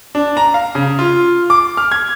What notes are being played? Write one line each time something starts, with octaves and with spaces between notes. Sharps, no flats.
D4
A#5
F5
C#3
F4
D6
F6
G#6